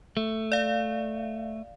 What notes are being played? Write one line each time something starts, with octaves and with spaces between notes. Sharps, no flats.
A3
D5 F5